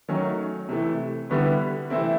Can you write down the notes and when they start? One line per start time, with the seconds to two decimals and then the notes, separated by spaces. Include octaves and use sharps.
0.08 D#3 F#3 A3 C#4
0.69 C3 E3 A3
1.30 D3 G3 B3 E4
1.90 C3 E3 A3 C4 E4